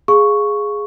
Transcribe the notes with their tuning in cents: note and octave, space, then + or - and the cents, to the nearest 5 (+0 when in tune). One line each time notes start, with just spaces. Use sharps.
G#4 +0 F5 +5 C#6 +0